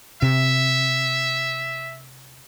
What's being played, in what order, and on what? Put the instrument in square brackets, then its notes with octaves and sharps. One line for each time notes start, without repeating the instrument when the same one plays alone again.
[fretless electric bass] C3 [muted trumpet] E5